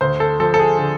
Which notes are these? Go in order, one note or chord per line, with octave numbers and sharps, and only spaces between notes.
D2 C5
A4
F3 A4
A4
G#4
D3